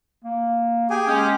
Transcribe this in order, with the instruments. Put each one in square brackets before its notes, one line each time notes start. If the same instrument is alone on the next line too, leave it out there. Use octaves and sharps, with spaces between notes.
[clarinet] A#3
[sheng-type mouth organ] G4 G#4 G#5 [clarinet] G5
[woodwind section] G#3 C#4